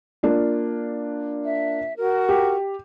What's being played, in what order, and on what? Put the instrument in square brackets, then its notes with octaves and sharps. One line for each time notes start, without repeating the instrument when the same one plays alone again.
[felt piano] A#3 D4 F4
[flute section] E5
F#4 A#4
[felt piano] G4